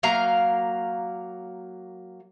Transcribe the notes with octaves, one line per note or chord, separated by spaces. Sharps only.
F#3 A#3 F5 A#5